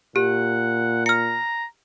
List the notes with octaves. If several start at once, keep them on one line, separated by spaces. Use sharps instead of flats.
A#2 G4 F#5
A#5 F6 C#7